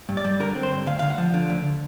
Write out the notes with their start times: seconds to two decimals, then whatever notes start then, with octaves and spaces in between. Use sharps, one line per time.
0.09 G2
0.17 D5
0.24 G3
0.40 D3 A#4
0.55 C4
0.63 C5
0.72 G2
0.87 D2 F5
0.99 D2 F5
1.10 F#5
1.18 F3
1.34 D3
1.50 D2